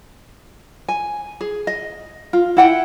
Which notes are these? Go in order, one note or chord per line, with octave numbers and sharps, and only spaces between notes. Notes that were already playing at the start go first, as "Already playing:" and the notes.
G#5
G#4
D#5
F4
E4 F#5 G5